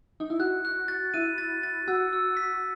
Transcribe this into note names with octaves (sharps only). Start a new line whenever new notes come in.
D#4
E4
F#4 F#6
F#6
A6
E4 D#7
A6
A6
F#4 E6
E6
B6